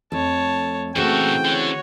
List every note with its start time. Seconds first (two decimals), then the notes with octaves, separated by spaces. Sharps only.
0.12 F2 A3 C#5 A5
0.96 A#2 C#3 E3 A3 C4 F#4 E5 G5
1.45 D3 F#4 C#5